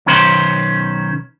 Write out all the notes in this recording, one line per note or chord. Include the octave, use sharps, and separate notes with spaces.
B1 D#3 C#4 B4 C5